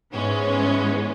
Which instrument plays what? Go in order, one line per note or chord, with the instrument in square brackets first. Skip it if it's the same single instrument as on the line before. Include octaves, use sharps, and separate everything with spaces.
[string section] G#2 E3 G#3 B3 C#4